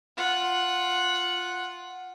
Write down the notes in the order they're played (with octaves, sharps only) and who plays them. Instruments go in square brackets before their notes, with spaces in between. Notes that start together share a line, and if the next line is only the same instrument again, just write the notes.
[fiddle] F4 F#5